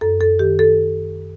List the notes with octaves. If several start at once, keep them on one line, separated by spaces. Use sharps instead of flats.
F#2 A4
A4
D#3 G4
A4